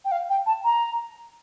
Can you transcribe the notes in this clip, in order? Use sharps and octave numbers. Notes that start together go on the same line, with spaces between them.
G5
F5
G5
A5
A#5